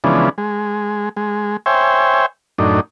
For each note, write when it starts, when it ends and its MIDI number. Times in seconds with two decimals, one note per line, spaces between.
0.04 0.29 49
0.04 0.29 52
0.04 0.29 53
0.04 0.29 56
0.04 0.29 59
0.04 0.29 62
0.38 1.09 56
1.17 1.57 56
1.66 2.26 72
1.66 2.26 73
1.66 2.26 76
1.66 2.26 79
1.66 2.26 80
2.58 2.80 42
2.58 2.80 45
2.58 2.80 62
2.58 2.80 63